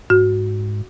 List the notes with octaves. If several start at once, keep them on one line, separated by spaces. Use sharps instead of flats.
G#2 F#4